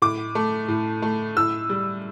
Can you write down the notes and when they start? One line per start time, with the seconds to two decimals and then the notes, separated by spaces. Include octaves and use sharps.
0.02 A2 D6
0.35 A3
0.68 A2
1.02 A3
1.37 A2 E6
1.70 G3